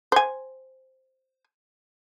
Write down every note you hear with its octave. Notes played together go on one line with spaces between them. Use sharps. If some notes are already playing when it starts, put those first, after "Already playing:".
C5 G#5